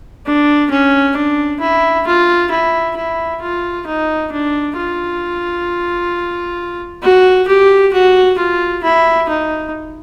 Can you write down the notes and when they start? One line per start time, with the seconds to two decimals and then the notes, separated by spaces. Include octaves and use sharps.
0.25 D4
0.70 C#4
1.15 D4
1.60 E4
2.06 F4
2.51 E4
2.96 E4
3.41 F4
3.86 D#4
4.32 D4
4.77 F4
7.02 F#4
7.48 G4
7.93 F#4
8.38 F4
8.83 E4
9.29 D#4